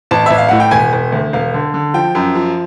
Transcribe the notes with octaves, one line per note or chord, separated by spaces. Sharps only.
A1 A5
A1 E5
F5
A2 F#5
G5
E1 G#5
E1
D2
E1 F5
D3
D3
F3 G5
F#2
F3